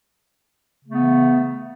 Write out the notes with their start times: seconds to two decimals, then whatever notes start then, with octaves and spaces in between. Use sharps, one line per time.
0.85 C#3
0.89 A3
0.92 B3
0.96 E3